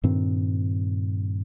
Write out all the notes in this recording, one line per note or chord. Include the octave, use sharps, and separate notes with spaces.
G2 A#2 D#3 C4